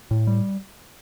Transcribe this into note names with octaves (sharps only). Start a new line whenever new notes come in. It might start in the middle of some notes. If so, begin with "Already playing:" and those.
A2
G3